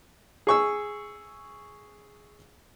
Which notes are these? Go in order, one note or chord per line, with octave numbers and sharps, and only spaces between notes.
G#4 C#6 E6